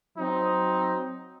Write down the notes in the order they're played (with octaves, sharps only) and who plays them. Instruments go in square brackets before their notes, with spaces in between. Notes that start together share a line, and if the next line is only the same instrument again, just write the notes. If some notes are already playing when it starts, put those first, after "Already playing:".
[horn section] F#3 C4 D#4